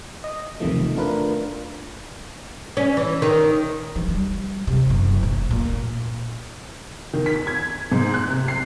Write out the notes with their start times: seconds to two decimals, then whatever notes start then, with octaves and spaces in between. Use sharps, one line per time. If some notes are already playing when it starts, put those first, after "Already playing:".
0.24 D#5
0.60 B1 E2 C3 D#3 F3 A3
0.96 A3 D4 F4 A#4 B4
2.77 C#4
2.97 E3
3.22 D#3
3.96 E3
4.08 G3
4.67 C3
4.90 F#1
5.23 A#2
5.51 A#2
7.13 D#3
7.26 B6
7.47 G#6
7.92 G#2
8.14 F#6
8.29 C3
8.48 C7